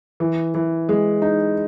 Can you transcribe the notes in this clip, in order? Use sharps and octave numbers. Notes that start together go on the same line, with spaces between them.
E3
E3
G#3
D#4